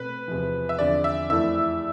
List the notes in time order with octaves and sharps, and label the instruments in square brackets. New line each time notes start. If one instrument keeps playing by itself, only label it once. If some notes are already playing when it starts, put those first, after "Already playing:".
Already playing: [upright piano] B2 A3 C4 [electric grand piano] B4
[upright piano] E2 C3 F3
[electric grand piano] E5
[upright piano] E2 D3 F3 C4 [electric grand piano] D5
[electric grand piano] E5
[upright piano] F2 E3 A3 E4 A4 [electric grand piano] E5